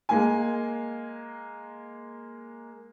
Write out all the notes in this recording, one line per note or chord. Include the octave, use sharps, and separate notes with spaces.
G#3 A#3 G#5